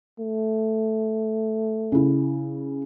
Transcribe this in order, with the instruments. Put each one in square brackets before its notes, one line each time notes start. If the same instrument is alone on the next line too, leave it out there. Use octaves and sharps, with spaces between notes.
[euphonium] A3
[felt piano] C#3 E4